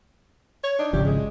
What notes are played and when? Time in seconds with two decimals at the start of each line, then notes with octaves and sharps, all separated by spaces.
0.63 C#5
0.79 D4 D#4 D5
0.93 G#1 C#3 F3 A3 G4
1.05 G#3